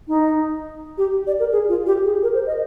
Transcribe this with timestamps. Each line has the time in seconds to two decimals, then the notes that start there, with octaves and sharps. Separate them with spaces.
0.08 D#4
0.98 G4
1.27 D5
1.39 A#4
1.52 G#4
1.69 F4
1.86 G4
2.05 G#4
2.23 A#4
2.34 C5
2.47 D#5